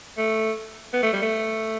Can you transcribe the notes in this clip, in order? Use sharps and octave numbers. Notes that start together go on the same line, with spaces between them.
A3
B3
A3
G3
A3